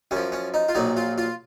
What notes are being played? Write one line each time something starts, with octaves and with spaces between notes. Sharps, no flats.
F#2 F3 C#4
C#4
D#4
F4
A#1 A#2 F#3 D#4
F4
F4